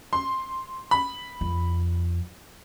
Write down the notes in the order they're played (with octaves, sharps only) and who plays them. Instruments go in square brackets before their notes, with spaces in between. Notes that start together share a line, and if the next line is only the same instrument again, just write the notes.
[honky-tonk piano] C6
B5
[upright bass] F2